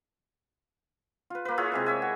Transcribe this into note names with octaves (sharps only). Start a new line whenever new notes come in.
F4 B4
A#3 B4
E4 F4 G#4 C#5
C3 G#3 E5
C#5 E5 G#5
F#4